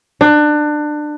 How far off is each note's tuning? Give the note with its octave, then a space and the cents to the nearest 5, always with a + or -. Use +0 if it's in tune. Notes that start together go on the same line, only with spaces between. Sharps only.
D4 +25